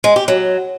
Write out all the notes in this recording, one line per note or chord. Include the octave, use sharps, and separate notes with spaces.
G#3
G4
F#3